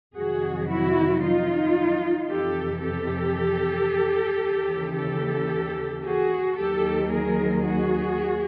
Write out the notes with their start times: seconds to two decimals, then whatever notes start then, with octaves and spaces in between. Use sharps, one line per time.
0.16 F2 C3 D#3 F#3 F#4 G#4
0.69 E4 F#4
1.22 D#4 F4
2.29 F2 C3 E3 G4 A4
2.83 G4 A4
4.43 D#2 C#3 E3
4.97 G4 A4
6.04 F#4 G#4
6.57 D#2 D#3 F#3 G4 A4
7.10 G#4 A#4
7.64 F#4 G#4